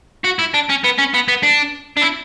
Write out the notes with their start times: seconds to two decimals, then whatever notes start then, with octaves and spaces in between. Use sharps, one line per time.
0.24 F#4
0.39 E4
0.54 D4
0.69 C#4
0.84 B3
0.98 C#4
1.14 B3
1.28 B3
1.43 D4
1.97 D4
2.02 E4